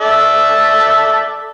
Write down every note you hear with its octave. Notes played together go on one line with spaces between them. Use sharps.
A4 D5 E5